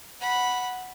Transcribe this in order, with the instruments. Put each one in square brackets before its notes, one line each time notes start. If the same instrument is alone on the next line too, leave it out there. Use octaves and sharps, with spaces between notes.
[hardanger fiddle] F#5 B5